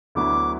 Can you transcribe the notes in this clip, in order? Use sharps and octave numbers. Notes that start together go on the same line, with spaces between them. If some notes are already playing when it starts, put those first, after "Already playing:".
D2 D3 F#3 B3 E4 D6